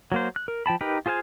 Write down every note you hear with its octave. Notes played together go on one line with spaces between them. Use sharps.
F#3 A#3 C5
F#6
A#4
F3 G5 A5 B5
D#4 G4 A#4 B4
F4 G#4 C5 F5 G#5